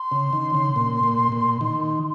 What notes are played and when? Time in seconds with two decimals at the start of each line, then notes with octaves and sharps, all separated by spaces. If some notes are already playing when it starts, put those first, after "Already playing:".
Already playing: C6
0.12 C#3
0.33 D#3
0.55 C#3
0.76 A#2
1.03 A#2
1.32 A#2
1.61 D#3